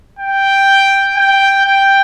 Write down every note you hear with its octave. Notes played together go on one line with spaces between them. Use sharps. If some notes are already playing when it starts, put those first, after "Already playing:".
G5
G5
G5